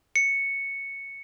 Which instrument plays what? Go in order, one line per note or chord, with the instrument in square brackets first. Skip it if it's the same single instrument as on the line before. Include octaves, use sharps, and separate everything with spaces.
[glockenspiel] C#7